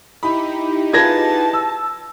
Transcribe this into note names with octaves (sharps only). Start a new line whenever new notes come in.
D#4 E4 G4 B5
F4 G#4 B4 A5 G#6 A#6
E6